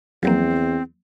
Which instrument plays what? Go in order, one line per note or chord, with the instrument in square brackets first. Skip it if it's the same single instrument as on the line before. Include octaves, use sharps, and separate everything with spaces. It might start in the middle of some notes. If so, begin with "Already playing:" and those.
[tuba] E2 [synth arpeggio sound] F3 F#3 A#3 [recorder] C4